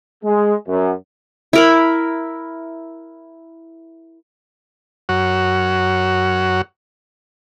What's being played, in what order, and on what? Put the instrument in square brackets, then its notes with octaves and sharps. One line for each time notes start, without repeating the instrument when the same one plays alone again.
[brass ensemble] G#3
F#2
[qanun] E4 A#4 B5
[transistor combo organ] F#2 F#4 C#5